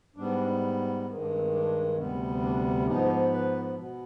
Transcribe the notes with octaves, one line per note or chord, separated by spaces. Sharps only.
G#2 G3 B3 D4
G2 D#3 G#3 D#4
D4
C4
D4
D2 C3 G3 B3
D4
G#2 F3 B3 D#4
B4
B2 B3